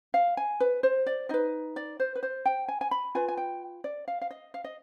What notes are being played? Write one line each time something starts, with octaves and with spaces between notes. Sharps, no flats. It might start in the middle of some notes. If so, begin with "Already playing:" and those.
F5
G#5
B4
C5
D5
D#4 B4 D#5
D5
C5
B4
C5
G5
G#5
G#5
B5
F4 B4 G#5
G#5
G5
D5
F5
F5
D#5
F5
D#5